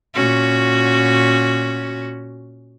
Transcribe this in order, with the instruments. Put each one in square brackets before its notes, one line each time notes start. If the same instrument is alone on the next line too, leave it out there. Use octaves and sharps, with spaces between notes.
[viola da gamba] A#2 C#4 F#4